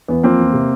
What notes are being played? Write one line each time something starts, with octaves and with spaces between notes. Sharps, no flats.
E2 B3
F3 A#3 C4
E2
C3